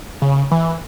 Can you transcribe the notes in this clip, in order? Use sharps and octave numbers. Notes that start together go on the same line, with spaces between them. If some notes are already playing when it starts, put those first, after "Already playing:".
C#3
E3